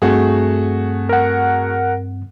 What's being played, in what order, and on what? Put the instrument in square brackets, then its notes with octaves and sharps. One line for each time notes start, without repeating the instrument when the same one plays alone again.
[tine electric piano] G2 C4 [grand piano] A3 F#4 G#4
[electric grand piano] A#4 F#5